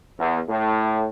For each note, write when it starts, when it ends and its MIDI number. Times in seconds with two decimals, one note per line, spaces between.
0.18 0.40 40
0.49 1.07 45